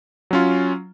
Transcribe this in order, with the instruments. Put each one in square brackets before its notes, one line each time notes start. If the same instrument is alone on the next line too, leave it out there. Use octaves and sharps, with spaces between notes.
[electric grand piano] F#3 C#4 F4